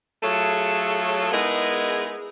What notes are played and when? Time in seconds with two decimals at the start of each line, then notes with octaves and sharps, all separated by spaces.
0.23 F#3 A3 F4 G#4 A4 C#5
1.32 G#3 B3 D#4 E4 G#4 A#4